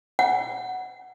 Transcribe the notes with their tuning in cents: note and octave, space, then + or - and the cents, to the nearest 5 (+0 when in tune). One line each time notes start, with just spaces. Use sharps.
F#5 +0